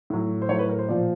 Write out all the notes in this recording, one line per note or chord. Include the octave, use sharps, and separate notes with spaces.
A2 F#3
C5
A2 F#3 C#5
B4
A#4
C5
A#2 F3 D5